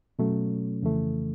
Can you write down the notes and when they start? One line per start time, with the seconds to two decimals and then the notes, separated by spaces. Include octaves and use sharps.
0.19 B2 F#3 A3 C#4
0.82 F2 C#3 E3 A3